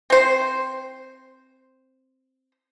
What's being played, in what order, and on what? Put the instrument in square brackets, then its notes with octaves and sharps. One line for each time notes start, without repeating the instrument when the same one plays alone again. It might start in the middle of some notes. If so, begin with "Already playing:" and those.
[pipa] C4 C5